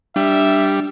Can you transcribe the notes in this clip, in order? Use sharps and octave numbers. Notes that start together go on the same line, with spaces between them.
G3 D4 E5